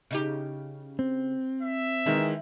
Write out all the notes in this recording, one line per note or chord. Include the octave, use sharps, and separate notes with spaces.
C#3 D#4 G4
C4
E5
D#3 E3 G#3 D#4